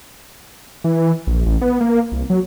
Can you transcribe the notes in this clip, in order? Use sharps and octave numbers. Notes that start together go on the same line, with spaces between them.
E3
A#1
A1
B3
A#3
C2
F#3